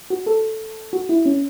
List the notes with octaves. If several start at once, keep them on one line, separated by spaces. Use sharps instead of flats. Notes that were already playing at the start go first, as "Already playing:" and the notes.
F#4
A4
F#4
E4
C#4